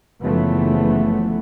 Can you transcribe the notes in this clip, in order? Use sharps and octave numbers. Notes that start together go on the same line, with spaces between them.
F#1 C#3 E3 F3 A3 B3